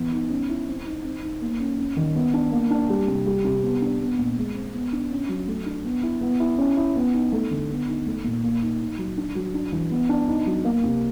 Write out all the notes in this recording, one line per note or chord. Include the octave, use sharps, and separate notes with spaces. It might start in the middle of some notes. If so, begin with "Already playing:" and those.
Already playing: E3 B3
D#4
C#4
E4
C4
D#4
C4
D#4
A#3
C#4
C#4
D#3
B3
D4
A#3
D4
G3
C3
G3
C3
B3
D4
B3
A#2
G#3
C4
B3
D4
C#4
F#3
A3
D4
B3
E4
B3
E4
C#4
E4
B3
D#4
A3
D3
B3
D#4
A3
A#2
A#3
D#4
D#4
F#3
D4
F#3
D4
E3
B3
D4
D#4
F#3
A#3
C3